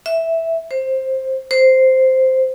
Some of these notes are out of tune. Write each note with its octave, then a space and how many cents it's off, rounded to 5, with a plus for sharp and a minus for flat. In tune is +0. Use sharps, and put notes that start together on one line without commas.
E5 -5
C5 +10
C5 -5